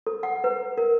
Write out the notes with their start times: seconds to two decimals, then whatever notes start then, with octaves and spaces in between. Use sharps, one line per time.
0.07 A4
0.23 F#5
0.44 B4
0.78 A#4